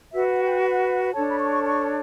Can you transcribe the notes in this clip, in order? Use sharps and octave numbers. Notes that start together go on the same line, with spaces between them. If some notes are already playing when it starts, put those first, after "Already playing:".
F#4 B4 E5
F#5
G5
F#5
D4 A4 C#5 A5
B5
C#6
C#6
C#6